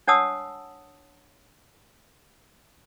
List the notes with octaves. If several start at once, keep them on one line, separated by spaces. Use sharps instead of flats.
D4 C#5 F#5 A5 D#6 E6